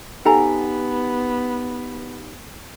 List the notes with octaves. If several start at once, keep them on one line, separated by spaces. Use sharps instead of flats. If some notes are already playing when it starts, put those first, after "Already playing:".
B3 D#4 G4 A4 F#5 G#5 A#5